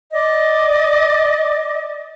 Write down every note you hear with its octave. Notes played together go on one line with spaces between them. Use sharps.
D5 D#5